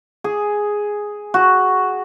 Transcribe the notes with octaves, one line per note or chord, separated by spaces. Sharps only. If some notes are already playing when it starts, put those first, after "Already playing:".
G#4
F#4